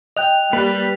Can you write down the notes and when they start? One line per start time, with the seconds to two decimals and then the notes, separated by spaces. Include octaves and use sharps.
0.17 D#5 G5 F#6 F7
0.53 G3 A#3 B4